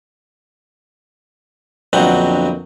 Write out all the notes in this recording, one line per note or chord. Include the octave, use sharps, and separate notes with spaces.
A#1 F2 D3 F#3 B3 G5